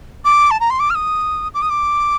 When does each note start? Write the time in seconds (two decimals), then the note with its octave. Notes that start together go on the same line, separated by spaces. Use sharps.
0.25 D6
0.51 A5
0.60 A#5
0.70 C6
0.80 D6
0.90 F6
0.95 D#6
1.54 D6
1.62 D#6
1.70 D6